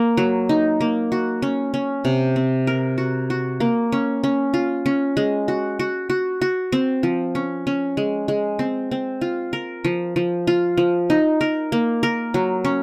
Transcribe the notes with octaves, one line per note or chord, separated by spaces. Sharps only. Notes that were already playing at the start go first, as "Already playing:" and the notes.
Already playing: A#3
F#3
D#4
A#3
F#4
C#4
C#4
C3
C4
A#4
F#4
F#4
A#3
C#4
C#4
F4
C#4
G#3
F#4
F#4
F#4
F#4
C4
F3
C#4
C#4
G#3
G#3
C4
C4
F4
A#4
F3
F3
F4
F3
D#4
A#4
A#3
A#4
F#3
C#4